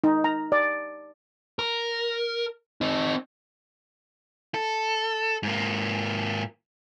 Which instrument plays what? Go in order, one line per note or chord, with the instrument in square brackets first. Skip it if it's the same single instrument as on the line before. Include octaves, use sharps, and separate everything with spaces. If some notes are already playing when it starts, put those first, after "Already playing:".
[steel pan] D#4
A#5
D5
[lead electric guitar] A#4
C4 D#4
A4
G#2 A#3